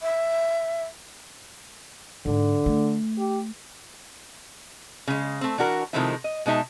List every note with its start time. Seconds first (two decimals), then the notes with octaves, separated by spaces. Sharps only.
0.02 E5
2.26 G#2 D3
2.66 A3
3.18 G4
5.07 C#3 G#3
5.41 A3 C4
5.58 E3 D4 F#4 A#4
5.93 C3 D#3 F3 G#3 A3 E4
6.24 D#5
6.46 B2 G#3 D#4 E5 A5